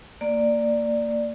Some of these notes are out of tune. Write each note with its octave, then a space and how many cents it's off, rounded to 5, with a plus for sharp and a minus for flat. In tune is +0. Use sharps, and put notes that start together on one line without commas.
A#3 -20 D5 +5